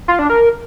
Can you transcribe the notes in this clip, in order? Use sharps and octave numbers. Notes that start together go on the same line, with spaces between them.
F4
D4
A#4